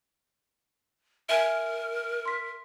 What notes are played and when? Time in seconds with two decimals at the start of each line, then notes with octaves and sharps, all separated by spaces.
1.29 A#4 E5 G#5 G#6
2.25 C6 B6